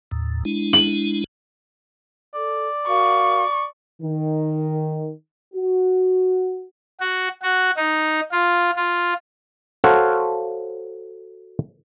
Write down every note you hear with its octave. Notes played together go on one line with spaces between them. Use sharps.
D#2 A2
G#3 D4 E4
F#7
A4 D5
F#4 A#4 F5 C#6
D#3
F#4
F#4
F#4
D#4
F4
F4
F#4 A4 C5 C#5 F5 F#5